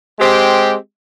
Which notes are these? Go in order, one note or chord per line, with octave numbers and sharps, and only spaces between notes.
G#3 C4 G4